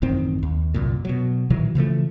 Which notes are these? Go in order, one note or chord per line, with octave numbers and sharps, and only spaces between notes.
A1 F#2 D#3 C4
D#2
C2 F#2 A#2
B2 F#3
A#2 D#3 E3 F#3
C#3 E3 F3 A3